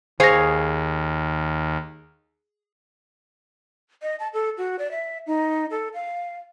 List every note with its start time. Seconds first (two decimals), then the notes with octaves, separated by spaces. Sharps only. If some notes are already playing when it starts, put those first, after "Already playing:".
0.20 D#2 G#4 C5 C#5 F5 A#6
4.02 D#5
4.20 A5
4.34 A4
4.58 F#4
4.79 D5
4.91 E5
5.27 D#4
5.71 A4
5.94 F5